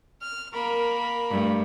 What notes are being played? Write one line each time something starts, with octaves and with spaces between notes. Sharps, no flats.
F6
A#3 A#4 B5
G2 A3